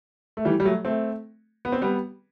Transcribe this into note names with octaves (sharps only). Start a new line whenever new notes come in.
A3
E3 G3
G3
F#3 A3
A3 C4
B3
C4
G3 B3